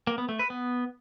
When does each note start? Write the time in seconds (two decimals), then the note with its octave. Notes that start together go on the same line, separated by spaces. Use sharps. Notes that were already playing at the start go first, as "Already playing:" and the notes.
0.07 A#3
0.18 B3
0.29 A3
0.39 B4
0.50 B3